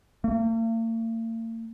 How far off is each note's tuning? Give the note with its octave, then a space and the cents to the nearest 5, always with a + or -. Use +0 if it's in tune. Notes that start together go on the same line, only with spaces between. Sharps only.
A#3 -45